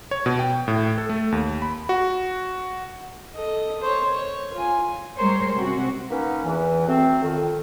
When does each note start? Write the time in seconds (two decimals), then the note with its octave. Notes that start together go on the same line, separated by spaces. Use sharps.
0.11 C#5
0.26 B2
0.39 G5
0.68 A2
0.98 A4
1.09 A3
1.32 D#2
1.62 B5
1.89 F#4
3.35 A4 D#5
3.81 C5 C#5
4.14 C#5
4.53 F4 G#5
5.17 G3 G#3 A#4 C5 C#5
5.57 C3 C4 C#4 F#4
6.10 A#3 B3 C#4 D#4 B4
6.44 E2 E3
6.87 F#3 A3 C4
7.23 F2 D#3